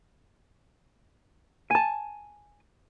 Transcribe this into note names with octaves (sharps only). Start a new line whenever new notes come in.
G#5 A5